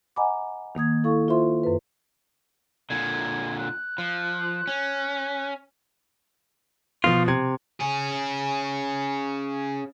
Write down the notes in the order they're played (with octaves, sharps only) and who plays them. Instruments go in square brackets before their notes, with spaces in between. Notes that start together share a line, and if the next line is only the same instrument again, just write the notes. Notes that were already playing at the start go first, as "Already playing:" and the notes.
[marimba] D#5 F#5 G#5 A#5 B5 D6
D#3 A#3 D#6 G#6
E4 A4 F5 C#6
F4 C5 E5 C6
F#2 B4
[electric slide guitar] A#2 D3 [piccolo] G#6
[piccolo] F#6
[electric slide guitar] F3
C#4
[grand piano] B2 F3 [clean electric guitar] F4
[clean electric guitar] C3 [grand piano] G#6
[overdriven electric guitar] C#4 G#4